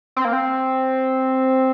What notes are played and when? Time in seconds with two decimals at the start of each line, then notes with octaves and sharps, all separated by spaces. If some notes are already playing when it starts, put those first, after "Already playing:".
0.16 C4
0.25 A#3
0.33 C4